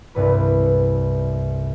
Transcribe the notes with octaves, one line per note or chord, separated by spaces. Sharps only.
C2 G2 B4